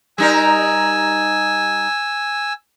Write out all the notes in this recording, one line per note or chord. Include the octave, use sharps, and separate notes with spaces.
G3 D#4 A#4 G#5 E6